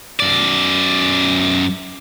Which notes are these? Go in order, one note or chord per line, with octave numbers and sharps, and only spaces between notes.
F#2 D5